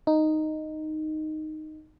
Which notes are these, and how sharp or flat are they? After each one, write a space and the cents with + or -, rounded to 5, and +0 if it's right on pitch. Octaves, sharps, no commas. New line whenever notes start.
D#4 -5